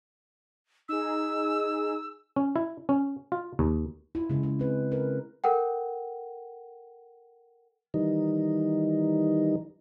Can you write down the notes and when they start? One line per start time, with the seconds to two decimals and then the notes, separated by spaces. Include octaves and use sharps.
0.89 D#4 G#4 E6
2.36 C#4
2.56 E4
2.89 C#4
3.32 F4
3.59 D#2
4.15 E4 F4
4.30 C#3 G#3 C#4
4.43 G#3
4.59 C4 B4
4.92 A#4 B4
5.44 A4 A#4 F#5 G5
7.94 D#3 E3 G3 D#4